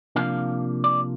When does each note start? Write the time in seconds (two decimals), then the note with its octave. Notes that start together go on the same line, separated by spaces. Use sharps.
0.16 C3 F3 A#3 D4 F5
0.84 D5